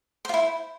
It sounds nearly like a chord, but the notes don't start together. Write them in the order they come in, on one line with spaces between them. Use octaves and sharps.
C5 F4 E4